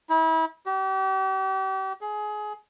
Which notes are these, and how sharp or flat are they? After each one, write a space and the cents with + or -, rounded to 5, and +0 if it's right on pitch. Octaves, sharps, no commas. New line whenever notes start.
E4 -35
G4 -40
G#4 +20